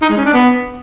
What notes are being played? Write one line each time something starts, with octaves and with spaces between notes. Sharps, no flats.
D#4
G#3
C#4
D4
B3